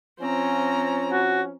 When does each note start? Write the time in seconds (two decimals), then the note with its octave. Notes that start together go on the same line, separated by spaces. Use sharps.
0.19 F3 C4 C#4 A#5
1.12 F#4